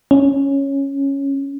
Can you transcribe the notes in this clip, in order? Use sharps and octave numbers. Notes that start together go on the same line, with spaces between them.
C#4